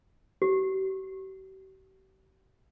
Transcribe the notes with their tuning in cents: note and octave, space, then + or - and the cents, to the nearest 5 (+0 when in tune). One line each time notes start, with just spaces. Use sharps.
G4 -45